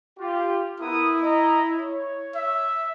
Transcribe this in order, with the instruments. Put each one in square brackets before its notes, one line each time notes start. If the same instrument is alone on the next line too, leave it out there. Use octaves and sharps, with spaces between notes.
[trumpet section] F4 G4
[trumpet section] B3 A#4 D#6 [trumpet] E4
[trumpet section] D#5 A#5
C#5
[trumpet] E5